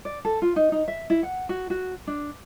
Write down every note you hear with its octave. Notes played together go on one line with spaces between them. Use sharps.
D5
A4
F4
D#4
D#4
E5
E4
F#5
F#4
F#4
D4